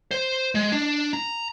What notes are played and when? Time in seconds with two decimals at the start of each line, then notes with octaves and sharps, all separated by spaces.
0.11 C5
0.55 G#3
0.72 D4
1.13 A#5